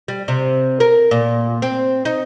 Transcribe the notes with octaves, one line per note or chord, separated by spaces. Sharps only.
G3
C3
A#4
A#2
C4
D#4